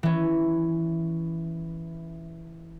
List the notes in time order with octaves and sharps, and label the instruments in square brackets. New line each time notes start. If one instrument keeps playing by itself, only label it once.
[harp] E3 C#4